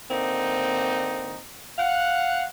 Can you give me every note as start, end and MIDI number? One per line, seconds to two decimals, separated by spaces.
0.10 1.39 50
0.10 1.39 58
0.10 1.39 60
0.10 1.39 63
1.79 2.45 77
1.79 2.45 78